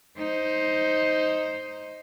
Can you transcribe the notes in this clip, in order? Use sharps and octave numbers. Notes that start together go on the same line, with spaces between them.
D#4 C5